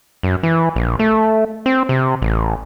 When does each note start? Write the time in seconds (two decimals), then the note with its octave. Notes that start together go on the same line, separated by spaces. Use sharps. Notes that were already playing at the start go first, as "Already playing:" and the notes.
0.23 F#2
0.43 E3
0.76 A#1
0.99 A3
1.66 C4
1.89 C3
2.22 A1